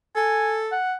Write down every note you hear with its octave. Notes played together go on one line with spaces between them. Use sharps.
A4 G#5
F#5